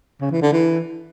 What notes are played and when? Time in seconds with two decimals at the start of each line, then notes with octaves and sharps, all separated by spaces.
0.21 C#3
0.32 E3
0.42 D3
0.52 E3